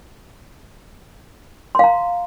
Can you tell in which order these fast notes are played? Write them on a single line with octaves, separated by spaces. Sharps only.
C6 F5 A#5